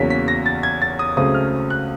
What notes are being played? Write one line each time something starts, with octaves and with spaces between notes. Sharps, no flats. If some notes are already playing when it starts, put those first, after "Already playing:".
Already playing: E2 C#3 F#3 A#3 C#4 B6
B6
A#6
A6
G#6
A6
D#6
C#2 C#3 F#3 A3 C4 D#6
F6
F#6